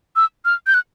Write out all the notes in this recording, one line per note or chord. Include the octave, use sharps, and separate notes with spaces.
E6
F6
G6
F#6